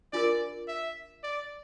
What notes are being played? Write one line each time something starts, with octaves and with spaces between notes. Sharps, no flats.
D4 F4 A#4 D5
E5
D5